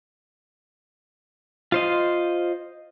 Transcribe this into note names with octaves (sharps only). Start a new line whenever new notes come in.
F4 C5 D#5